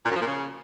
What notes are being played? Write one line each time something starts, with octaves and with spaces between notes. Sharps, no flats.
A#2
F#2
F3
A#2
C#3